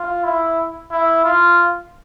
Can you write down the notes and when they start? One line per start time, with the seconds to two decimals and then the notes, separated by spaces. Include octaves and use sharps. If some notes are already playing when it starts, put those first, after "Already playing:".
Already playing: F4
0.24 E4
0.91 E4
1.25 F4